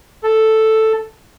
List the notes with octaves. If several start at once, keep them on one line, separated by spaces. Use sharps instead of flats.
A4